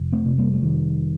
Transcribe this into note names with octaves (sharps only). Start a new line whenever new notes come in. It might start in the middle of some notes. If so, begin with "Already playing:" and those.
Already playing: F1
A3 C4
C3
G3 A#3
A3
F1 D#3 G3